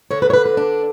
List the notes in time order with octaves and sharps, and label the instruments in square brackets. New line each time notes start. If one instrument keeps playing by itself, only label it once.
[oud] D3 [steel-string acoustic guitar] C#5
[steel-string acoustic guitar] B4
C#5
B4
B4
D4